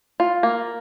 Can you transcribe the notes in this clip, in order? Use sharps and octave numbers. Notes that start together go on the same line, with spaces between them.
F4
A#3